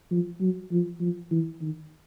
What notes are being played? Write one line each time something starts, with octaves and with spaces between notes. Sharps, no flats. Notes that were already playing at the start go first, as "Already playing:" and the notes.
F3
F#3
F3
F3
E3
D#3